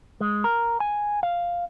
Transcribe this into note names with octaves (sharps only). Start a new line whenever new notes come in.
G#3
A#4
G#5
F5